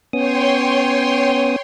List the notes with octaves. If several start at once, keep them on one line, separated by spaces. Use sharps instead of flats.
B3 C#4 C#5 G5 C6 D#6